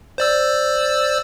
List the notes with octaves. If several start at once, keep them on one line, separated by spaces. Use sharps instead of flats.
C5 D5 E6